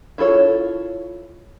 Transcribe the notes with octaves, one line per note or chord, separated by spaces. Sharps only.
E4 F4 A4 C#5